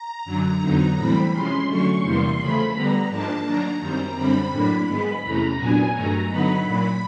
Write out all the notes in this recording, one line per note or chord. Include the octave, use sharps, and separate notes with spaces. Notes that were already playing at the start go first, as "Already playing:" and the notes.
Already playing: A#5
F#2 D3 F#3
F2 D3 F#3 B3 D#4
A2 E3 G3 C4 B5
C3 F3 G#3 C#4 C6
D3 F#3 A3 C#4 C#6
E2 C3 E3 G3 A#3 C6
C#3 F3 A3 B5
D3 G3 B3 A#5
G#2 F3 A#3 D4 A5
D#3 F#3 A#3 D4 A#5
F#2 D#3 G3 C4
F#2 D3 G3 C4 B5
A2 F#3 A#3 D4
G#2 D#3 G#3 B3
E2 C3 E3 A3 C#4 A#5
A#2 F#3 B3 D4 G#5
G2 D#3 F#3 A3 A#5
D3 F#3 B3 D#4 B5
A#2 F#3 A#3